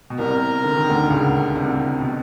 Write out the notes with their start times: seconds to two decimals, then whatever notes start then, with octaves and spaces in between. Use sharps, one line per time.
0.10 B2
0.18 C2 C3 A#4
0.64 D3
0.77 D#3
0.89 D2 D3
1.10 C#2 C#3
1.55 C2 C3
2.00 B2